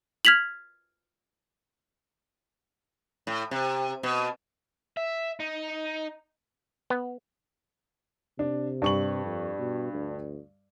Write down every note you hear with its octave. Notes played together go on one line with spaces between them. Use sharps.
F6 G#6 B6 F7 F#7
A2
C3
B2
E5
D#4
B3
C3 D4
G2 C#6 F#7
F2
B2
D2